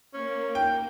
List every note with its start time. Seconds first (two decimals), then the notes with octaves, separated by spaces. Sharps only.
0.14 A#3 C#4
0.55 G5